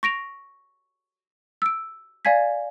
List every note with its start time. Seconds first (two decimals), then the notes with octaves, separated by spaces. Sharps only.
0.03 C#6 A#6 D7 F7
1.62 E6 D7
2.25 D5 F5 G#5 G#6 B6